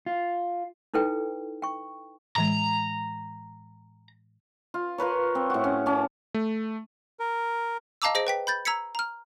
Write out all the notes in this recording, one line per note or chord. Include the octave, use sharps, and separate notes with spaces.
F4
D#4 E4 A4 B4 G5
G5 C#6
A2 E3 G#3 A#5
F4
F4 A#4 B4 C#5
C4
A2 F#4
C#4
C#4 A5 D6
A3
A#4
D#5 F5 A5 A#5 D6 E6
G#4 C5 D#5 A#6 D7
B4 G5 B6
B5 G6 A6
A#5 E6 G#6 B6 C#7
A#5 F6